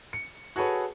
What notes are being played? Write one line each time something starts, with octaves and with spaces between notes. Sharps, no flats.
C#7
F#4 G#4 A4 B4 C#5